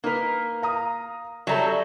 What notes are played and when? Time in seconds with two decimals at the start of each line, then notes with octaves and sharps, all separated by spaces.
0.04 A#3 D#4 A#4 B4
0.62 F5 A#5 D#6
1.47 F#3 G3 A4 E5 G#5 A#5